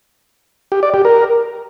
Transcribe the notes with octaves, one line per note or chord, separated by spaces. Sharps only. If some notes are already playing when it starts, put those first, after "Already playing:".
G4
D5
G4
A#4